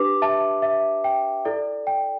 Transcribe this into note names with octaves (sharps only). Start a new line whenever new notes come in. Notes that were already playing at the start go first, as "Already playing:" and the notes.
Already playing: D4 G4 B4 D6
E5 A5
E5
G5
E4 A4 D5
G5